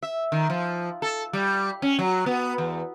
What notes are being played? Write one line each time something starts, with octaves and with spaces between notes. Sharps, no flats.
E5
D#3
F3
A4
G3
C#4
F#3
B3
E2